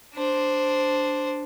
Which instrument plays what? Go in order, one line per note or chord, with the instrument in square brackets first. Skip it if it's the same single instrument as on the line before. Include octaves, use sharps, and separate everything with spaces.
[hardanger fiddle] D4 C5